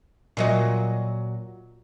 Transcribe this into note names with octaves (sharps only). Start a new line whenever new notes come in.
A#2 F#3 D#5